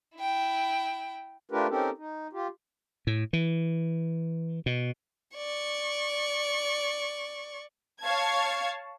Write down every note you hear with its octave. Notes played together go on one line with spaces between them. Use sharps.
E4 G5
A3 D4 F4 G4 A#4 B4
C4 C#4 D#4 G4 A4 A#4
D#4
F4 G4
A2
E3
B2
D5 C#6
C#5 F5 A5 G#6